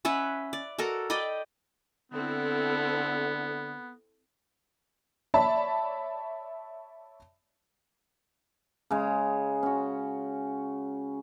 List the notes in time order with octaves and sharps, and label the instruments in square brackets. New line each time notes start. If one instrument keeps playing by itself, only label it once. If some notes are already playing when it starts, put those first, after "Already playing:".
[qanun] C#4 B4 E5 F#5
D5
F#4 A4 A#4
D5 D#5 G5 B5
[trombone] D3 [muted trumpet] B3 [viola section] C4 E4 A4
[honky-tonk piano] C#5 D5 E5 A5 B5
[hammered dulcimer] C#3 G#3
C#4 F#4